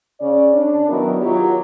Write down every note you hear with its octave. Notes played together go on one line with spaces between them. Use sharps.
C#3 C#4 D5
D4
D#3 F#3 B3 E4 A#4
F#3 F4 G4 C#5